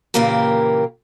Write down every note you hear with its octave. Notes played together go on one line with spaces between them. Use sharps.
A#2 C#3 E3 A#3 G4 A#4